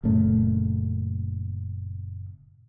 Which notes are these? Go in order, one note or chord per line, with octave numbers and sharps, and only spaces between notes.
F#1 A#2 C#3 A3